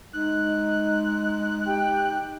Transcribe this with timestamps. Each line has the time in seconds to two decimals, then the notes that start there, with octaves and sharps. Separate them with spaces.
0.13 G#3 D#4 F#6
1.65 G4 G5